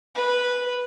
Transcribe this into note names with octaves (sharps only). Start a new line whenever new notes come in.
B4